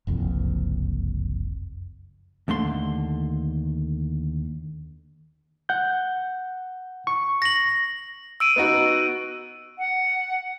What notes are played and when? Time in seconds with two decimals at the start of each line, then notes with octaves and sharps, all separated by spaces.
0.07 F#1 C2 F2
2.48 D#2 D3 A3 C6
5.69 F#5 G6
7.07 C#6
7.42 A#6 F#7
8.40 E6 D7 D#7
8.56 B3 D#4 F#4
9.78 F#5